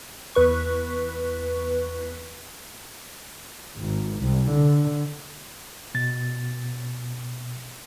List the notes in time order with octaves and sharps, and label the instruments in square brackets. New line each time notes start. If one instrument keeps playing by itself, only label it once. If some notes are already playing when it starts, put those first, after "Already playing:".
[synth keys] E2 B4 C#6
[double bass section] G#1
C2
D3
[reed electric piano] B2 A6